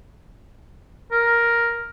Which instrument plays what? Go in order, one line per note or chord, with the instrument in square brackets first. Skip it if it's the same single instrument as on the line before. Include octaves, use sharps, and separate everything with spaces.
[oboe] A#4